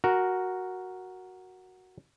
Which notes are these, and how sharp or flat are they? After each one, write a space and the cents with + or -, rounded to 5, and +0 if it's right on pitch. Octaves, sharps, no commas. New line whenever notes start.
F#4 +0 A#4 +0